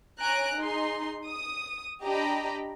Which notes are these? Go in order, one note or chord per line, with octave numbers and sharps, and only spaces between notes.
C#5 G#5 A#5 F#6 D7
D#4 G#4 C6
D#6
D4 G4 D#5 G5 A#5 B5